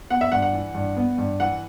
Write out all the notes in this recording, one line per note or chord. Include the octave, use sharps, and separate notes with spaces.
B3 F#5
E5
G2 F#5
F#5
E3
G2
B3
G2
E3 F#5